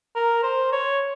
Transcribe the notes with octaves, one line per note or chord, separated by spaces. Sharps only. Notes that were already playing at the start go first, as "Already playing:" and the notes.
A#4
C5
C#5